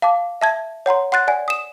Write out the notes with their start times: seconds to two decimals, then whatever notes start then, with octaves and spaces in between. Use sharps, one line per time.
0.02 F5 A5 D6
0.41 E5 A5 G#6
0.86 C#5 F#5 A#5 C6
1.12 F#5 C6 F#6 A6
1.28 D5 F#5 G#5
1.48 D#6 E7